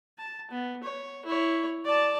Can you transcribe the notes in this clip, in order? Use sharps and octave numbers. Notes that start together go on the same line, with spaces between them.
A5
B3
C#5
E4 C#5
D5 A5